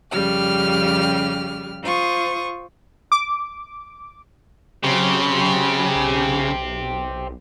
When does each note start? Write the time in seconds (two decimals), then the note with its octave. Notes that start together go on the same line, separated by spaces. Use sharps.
0.11 F2 C#3 G3 G4 F6
1.83 F4 C5 C#6 D#6
3.12 D6
4.84 C#3 F#3 C4 G4
5.95 B1